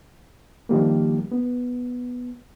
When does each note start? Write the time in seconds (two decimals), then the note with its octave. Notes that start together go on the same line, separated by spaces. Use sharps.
0.69 D#3 F3 G3 A#3
1.32 B3